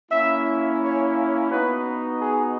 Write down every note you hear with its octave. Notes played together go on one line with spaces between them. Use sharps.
A#3 C#4 E4 E5
C#5
B3 D#4 F#4 B4
G#4